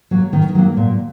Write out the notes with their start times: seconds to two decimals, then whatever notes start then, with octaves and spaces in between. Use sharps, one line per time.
0.11 F#3 A#3
0.33 D#3
0.55 F#3 A#3
0.77 A#2